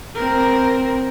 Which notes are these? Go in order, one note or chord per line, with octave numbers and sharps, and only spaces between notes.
C4 A#4